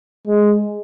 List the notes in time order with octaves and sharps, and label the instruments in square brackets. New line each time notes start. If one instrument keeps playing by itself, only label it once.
[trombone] G#3